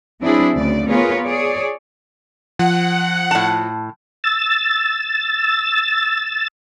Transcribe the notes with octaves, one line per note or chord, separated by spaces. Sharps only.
F#3 C4 D4 E4 G#4
D2 C#3 D5
B3 F4 G#4 A#4 B4 C#5
G#4 C#5 D5
F3 F#5
A2 A5
E6 A6